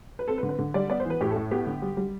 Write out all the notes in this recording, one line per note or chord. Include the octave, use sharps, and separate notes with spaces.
B4
C4 A4
B4
D3
B4
D3
G3 D5
B3 D5
C5
E3
B4
A2 G4
A4
A2
B3 G4
D3
G3
G3